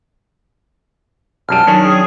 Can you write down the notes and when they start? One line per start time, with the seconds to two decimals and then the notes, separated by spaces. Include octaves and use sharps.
1.49 B1 F#2 G3 A5 F6
1.67 D#3 F#3 C#4 D4
1.84 G#4 G5